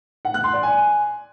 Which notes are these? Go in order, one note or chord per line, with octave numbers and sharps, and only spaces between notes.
F#5
F#6
C6
D5
G#5